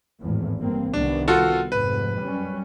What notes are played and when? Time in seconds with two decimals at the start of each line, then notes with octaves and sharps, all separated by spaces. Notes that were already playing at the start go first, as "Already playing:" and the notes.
0.21 G#1 E2 A2
0.59 G2 A#3 C4
0.93 C2 D#3 B3 D4
1.28 F4 F#4 A4
1.72 F1 G#2 B4
2.23 F#2 G3 C#4